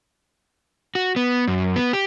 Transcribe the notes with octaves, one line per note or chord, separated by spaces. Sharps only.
F#4
B3
F#2
B3
G4